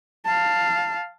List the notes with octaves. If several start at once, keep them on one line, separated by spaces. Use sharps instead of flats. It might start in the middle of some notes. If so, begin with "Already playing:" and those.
F5 A5